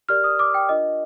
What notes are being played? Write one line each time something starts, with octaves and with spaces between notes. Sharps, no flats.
G4 A#4 D5 F6
D#6
D6
G5
D4 F4 A#4 D#5